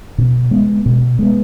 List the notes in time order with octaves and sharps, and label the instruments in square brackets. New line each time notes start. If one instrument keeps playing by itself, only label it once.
[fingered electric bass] B2
G#3 B3
B2
G#3 B3